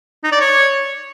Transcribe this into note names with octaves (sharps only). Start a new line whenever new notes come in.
D#4
D5
C#5